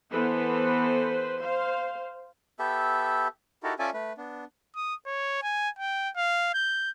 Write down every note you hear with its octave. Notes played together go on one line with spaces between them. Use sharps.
E3 B3 A4 B4 C5
C5 F5
B3 G4 A4 E5
D#4 E4 F#4 G4 A4 A#4
C#4 F4 A4 D5 E5 G#5
A3 B4
B3 D4
D#6
C#5
G#5
G5
F5
G6